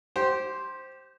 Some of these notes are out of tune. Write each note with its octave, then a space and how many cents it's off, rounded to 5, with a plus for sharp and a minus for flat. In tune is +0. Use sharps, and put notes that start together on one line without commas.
G4 -15 C5 +5